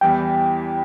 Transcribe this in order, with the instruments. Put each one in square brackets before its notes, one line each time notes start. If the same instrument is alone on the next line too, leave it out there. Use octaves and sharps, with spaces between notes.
[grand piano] E2 E3 G3 E4 [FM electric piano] G5